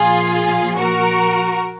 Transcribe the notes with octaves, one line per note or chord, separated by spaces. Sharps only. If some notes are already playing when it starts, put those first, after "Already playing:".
Already playing: A#2 F3 F4 G#4
F#4 A#4